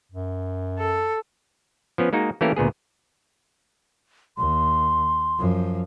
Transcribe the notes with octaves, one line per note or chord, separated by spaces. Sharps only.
F#2
A4
F3 B3 C#4
G#3 A#3 D#4 F#4
E3 A3 A#3 C#4 G4 A#4
D2 A#2 B3 G#4
D#2 C6
F#2 F3